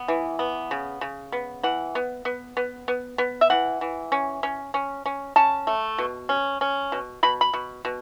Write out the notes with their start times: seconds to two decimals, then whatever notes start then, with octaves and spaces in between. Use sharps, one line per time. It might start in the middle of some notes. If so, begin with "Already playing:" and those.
Already playing: B3
0.08 E3
0.39 B3
0.71 C#3
1.01 C#3
1.32 B3
1.63 E3 F#5
1.95 B3
2.25 B3
2.57 B3
2.88 B3
3.18 B3
3.41 E5
3.50 E3 F#5
3.81 E3
4.12 C#4
4.43 C#4
4.74 C#4
5.06 C#4
5.36 C#4 A5
5.67 A3
5.98 B2
6.29 C#4
6.61 C#4
6.92 B2
7.23 B2 B5
7.41 B5
7.54 B2
7.85 B2